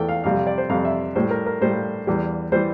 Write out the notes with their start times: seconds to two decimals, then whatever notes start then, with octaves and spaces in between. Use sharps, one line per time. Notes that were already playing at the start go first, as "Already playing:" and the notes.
Already playing: E2 E3 A3 A4 G5
0.09 F5
0.24 F2 C3 G3 F5
0.35 F5
0.47 D5
0.58 C5
0.69 F2 C3 G3 F5
0.85 E5
1.16 A2 G3 C5
1.31 A#4
1.46 A#4
1.61 A2 G3 C5
2.07 E2 E3 G3
2.52 E3 G3 C5